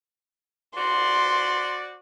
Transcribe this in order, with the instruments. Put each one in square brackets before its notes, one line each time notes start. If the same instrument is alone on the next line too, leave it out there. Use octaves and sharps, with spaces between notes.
[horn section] F#4 C5 D5 [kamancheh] C6